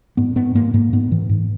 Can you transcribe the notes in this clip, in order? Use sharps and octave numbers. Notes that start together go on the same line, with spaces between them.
G#2 B3
G#2 B3
G#2 A#3
G#2 A#3
G#2 B3
G#2 E3
G#2